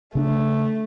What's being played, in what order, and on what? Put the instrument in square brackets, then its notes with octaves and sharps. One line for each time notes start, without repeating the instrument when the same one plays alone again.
[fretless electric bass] C#3 C4 D4 [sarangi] A3